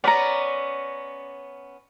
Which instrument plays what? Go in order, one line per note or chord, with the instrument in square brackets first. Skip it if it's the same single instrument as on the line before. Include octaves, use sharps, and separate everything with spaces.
[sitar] B3 C#4 [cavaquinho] D5 A#5